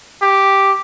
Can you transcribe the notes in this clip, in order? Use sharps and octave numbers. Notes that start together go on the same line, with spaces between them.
G4